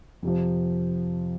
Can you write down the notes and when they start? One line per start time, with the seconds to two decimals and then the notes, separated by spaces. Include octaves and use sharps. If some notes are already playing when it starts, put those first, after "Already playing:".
0.23 F2 C3 F3